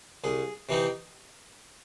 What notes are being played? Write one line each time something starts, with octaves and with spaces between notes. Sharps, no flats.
C2 G#4
C3 E3 C4 D#4